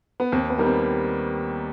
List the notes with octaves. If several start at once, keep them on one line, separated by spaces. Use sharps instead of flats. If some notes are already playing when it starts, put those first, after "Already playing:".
B3
D#2 C4
B3
D#3 G3 A#3
C4